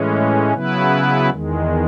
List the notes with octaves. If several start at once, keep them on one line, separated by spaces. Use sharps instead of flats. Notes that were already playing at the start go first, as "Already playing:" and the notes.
Already playing: A2 E3 G#3 C#4
C#3 F#3 B3 E4 B4
E2 D#3 G#3